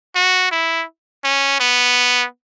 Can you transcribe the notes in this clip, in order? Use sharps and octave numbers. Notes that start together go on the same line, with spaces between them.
F#4
E4
C#4
B3